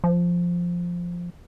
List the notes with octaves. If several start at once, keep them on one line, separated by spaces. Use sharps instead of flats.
F3